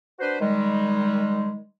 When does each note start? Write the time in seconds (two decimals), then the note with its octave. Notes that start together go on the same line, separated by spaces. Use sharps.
0.20 D4 F#4 B4 C5
0.40 D#3 G3 G#3